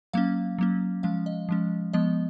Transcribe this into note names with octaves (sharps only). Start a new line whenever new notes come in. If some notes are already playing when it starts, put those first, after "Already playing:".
F#3 A#3 C#4 F5
F#3 A#3 C#4
F3 G#3 C#4 F5
D#5
F3 G#3 C#4
F3 G#3 B3 D#5